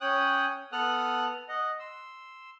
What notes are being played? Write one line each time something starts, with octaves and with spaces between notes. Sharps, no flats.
C#4 C#5 G5 D#6 F#6
B3 A4 F#5 D#6 F6 F#6
D#5 F#5
C6 E6